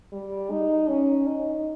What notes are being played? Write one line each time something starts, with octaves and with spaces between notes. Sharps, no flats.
G3
D#4
C#4
D#4